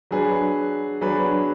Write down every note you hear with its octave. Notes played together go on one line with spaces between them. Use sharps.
F#3 D4 G#4 B4
F#3 D4 G#4 B4